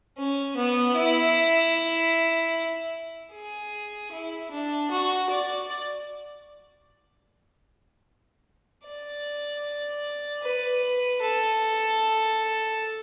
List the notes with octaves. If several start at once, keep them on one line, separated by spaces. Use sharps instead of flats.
C#4
B3
E4
G#4
E4
D4
F#4
D5
D5
B4
A4